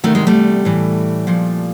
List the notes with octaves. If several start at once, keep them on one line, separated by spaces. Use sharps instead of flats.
E2 C3 D#3 A3
G#3
G3 A3
A2 E3
A#2 F3